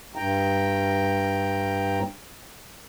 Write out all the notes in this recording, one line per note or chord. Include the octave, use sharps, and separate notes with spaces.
G2 G5 A#5